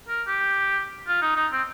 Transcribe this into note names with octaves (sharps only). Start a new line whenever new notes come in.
A#4
G4
F4
D#4
D#4
C4